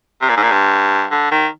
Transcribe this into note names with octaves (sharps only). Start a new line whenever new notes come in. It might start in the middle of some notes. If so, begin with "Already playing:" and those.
C3
A#2
G#2
A#2
G2
D3
D#3